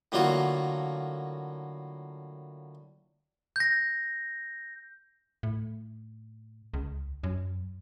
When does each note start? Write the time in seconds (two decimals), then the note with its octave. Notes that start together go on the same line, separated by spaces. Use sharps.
0.12 A2 D3 F#3 A#3 F4 F#4
3.56 G6 A#6
5.43 A2
6.74 C#2
7.23 F#2